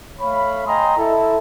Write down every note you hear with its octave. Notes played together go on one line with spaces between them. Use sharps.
A3 C#5 F5 B5
D#5 G5 G#5 A#5 C6 D#6
E4 A4